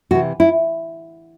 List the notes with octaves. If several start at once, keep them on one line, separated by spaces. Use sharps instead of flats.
C3 E3 F#4
E4